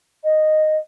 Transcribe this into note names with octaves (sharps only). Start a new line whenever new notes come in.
D#5